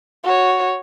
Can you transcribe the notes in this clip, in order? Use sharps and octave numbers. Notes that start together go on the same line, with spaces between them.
F#4 C#5